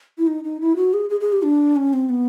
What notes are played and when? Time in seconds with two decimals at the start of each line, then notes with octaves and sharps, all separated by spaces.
0.18 E4
0.27 D#4
0.44 D#4
0.61 E4
0.76 F#4
0.94 G#4
1.10 G#4
1.20 G#4
1.32 G4
1.44 D4
1.76 C#4
1.93 C4
2.09 B3